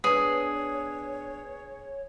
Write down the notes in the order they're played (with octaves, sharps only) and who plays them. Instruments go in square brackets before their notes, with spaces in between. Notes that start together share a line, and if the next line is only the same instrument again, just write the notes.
[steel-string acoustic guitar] B3 D4 [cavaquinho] G#4 [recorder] C#5